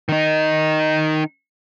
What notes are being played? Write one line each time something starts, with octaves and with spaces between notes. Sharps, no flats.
D#3 D#4